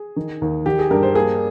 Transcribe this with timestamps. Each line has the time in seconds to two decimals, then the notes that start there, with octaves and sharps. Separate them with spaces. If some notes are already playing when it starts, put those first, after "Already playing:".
Already playing: G#4
0.16 D#3
0.42 D#2
0.66 D#3 G4
0.79 G#4
0.91 G2 A#4
1.03 C5
1.15 A#3 G#4